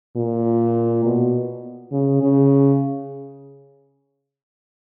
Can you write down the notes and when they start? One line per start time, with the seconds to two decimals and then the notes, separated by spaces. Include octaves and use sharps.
0.16 A#2
1.05 B2
1.92 C#3
2.22 C#3